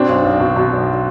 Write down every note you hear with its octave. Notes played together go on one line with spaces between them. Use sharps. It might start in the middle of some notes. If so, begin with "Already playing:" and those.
Already playing: B2 C4 D4
B1
B1
B2
B2
B1